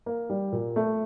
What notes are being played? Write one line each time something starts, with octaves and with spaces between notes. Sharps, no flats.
A#3
G3
A#2
A3